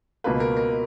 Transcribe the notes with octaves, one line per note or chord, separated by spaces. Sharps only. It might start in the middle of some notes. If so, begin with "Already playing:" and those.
C#2 B2 A#3 F4 B4
A#4
A#4